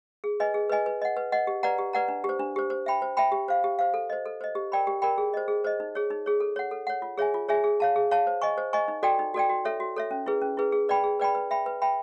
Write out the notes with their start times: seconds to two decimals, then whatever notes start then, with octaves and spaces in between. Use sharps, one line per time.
0.24 G#4
0.40 B4 D#5 G#5
0.54 G#4
0.70 B4 D#5 G#5
0.86 B4
1.02 D#5 F#5
1.17 B4
1.32 D#5 F#5
1.47 G4
1.63 B4 D5 F#5 A#5
1.78 G4
1.93 B4 D5 F#5 A#5
2.08 D4
2.24 G4 C5
2.39 D4
2.56 G4 C5
2.70 C5
2.86 E5 G5 B5
3.02 C5
3.17 E5 G5 B5
3.32 G4
3.48 C5 F5
3.64 G4
3.79 C5 F5
3.94 A4
4.10 C5 D#5
4.26 A4
4.41 C5 D#5
4.55 G4
4.72 A#4 D5 G5 B5
4.87 G4
5.02 A#4 D5 G5 B5
5.18 G#4
5.34 C5 D#5
5.48 G#4
5.64 C5 D#5
5.80 D#4
5.95 G#4 C#5
6.10 D#4
6.26 G#4 C#5
6.40 A4
6.56 C#5 F#5
6.71 A4
6.87 C#5 F#5
7.02 F4
7.18 G#4 C#5 E5 G#5
7.34 F4
7.49 G#4 C#5 E5 G#5
7.64 G#4
7.80 C#5 F5 A5
7.96 G#4
8.11 C#5 F5 A5
8.27 C5
8.42 D#5 G#5 C#6
8.58 C5
8.73 D#5 G#5 C#6
8.88 D#4
9.03 F#4 A4 D5 G5
9.19 D#4
9.34 F#4 A4 D5 G5
9.49 F#4
9.65 A4 C#5 E5
9.80 F#4
9.96 A4 C#5 E5
10.11 C#4
10.26 E4 G#4 B4
10.42 C#4
10.57 E4 G#4 B4
10.72 G#4
10.89 B4 D5 G5 B5
11.04 G#4
11.20 B4 D5 G5 B5
11.35 B4
11.51 E5 G5 B5
11.66 B4
11.82 E5 G5 B5